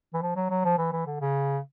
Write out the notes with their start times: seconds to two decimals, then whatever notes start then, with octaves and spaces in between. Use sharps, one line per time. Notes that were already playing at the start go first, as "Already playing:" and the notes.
0.14 E3
0.22 F3
0.36 F#3
0.50 F#3
0.65 F3
0.78 E3
0.92 E3
1.06 D3
1.21 C#3